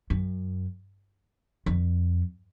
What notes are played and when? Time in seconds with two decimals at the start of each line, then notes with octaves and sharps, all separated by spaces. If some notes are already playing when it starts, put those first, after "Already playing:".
0.10 F#2
1.66 F2